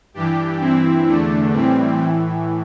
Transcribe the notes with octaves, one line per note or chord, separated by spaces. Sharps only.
G2 E3 D4 G4
G2 E3 C4 E4
E2 D3 A3 D4
A2 E3 G3 C4
A2 E3